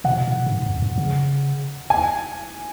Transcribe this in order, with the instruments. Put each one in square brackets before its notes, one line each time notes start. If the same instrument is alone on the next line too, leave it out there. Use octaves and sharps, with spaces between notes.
[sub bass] B2 [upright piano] F#5
[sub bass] A#2
A#2
G#2
F2
F#2
C#3
[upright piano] G#5